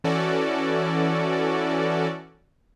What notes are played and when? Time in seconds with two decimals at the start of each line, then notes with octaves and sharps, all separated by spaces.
0.04 E3 C#4 F#4 A4 D5